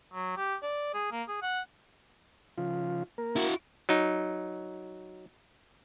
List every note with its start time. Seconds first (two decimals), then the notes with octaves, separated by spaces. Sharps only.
0.14 F#3
0.37 G4
0.63 D5
0.94 G#4
1.12 A#3
1.28 G#4
1.43 F#5
2.58 C#3 F3 F4
3.18 A#3 A#4
3.36 E4 F#4
3.89 F#3 D#4